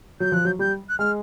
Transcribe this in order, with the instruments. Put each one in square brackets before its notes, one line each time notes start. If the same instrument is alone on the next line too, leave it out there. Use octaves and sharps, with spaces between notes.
[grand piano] F#3 [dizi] G6
[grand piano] F3 [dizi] F#6
[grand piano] F#3 [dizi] G6
[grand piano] G3 [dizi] G6
[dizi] F#6
[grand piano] G#3 [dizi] F6